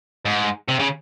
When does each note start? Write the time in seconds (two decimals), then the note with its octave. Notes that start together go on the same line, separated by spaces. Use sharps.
0.25 G#2
0.68 C3
0.79 C#3